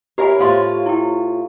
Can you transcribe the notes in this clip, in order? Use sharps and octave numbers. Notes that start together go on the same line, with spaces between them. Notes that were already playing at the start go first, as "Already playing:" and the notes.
E4 G4 A#4 C#5 E5 G#5
A2 F4 C5 C#5 F5 C6
E4 G5